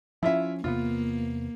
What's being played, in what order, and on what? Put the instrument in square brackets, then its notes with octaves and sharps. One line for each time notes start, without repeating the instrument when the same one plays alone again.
[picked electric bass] F3 C#4 [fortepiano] E4 F4 E5
[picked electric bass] E2 C3 B3 [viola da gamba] A#3 [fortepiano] F4